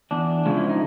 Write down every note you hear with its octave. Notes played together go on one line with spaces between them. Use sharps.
E2 D4
C#3 F3 G#3
E4
D#4